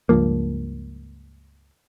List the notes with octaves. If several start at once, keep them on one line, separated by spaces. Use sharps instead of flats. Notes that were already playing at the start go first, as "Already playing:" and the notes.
C#2 G2 F3 A#3